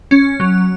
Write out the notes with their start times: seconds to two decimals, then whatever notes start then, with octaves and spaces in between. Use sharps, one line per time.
0.11 C#4
0.40 F#3